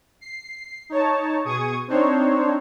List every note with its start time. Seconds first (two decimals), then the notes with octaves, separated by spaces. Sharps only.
0.21 C7
0.90 D#4 C#5 A5
1.45 B2 G#4 C#6 D#6 G#6
1.88 C4 D4 D#4 C5 C#5